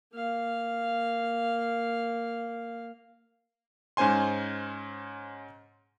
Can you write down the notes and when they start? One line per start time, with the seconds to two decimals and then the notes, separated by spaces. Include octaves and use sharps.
0.13 A#3 F5
3.97 G#2 C#4 C5 G#5 C6